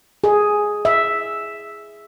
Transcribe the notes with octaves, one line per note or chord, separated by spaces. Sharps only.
G#4
E5